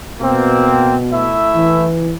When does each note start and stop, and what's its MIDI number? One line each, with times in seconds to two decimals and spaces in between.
0.21 1.34 47
0.21 0.96 58
0.21 0.96 60
1.11 1.87 57
1.11 1.87 64
1.11 1.87 76
1.56 2.16 52